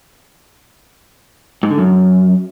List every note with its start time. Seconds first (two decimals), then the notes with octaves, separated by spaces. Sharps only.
1.63 G#2
1.71 D3
1.78 F#2